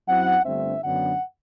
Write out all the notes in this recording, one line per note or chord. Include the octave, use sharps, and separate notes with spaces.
F#2 F#3 C4 E4 F#5
G1 G2 D3 A3 C4 E5
F#2 D3 F#3 B3 D4 F#5